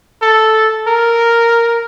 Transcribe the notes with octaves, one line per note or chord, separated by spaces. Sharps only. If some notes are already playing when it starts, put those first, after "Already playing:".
A4
A#4